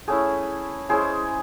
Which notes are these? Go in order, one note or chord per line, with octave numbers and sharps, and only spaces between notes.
A3 C#4 E4 G#4
G#3 C#4 E4 G#4 C5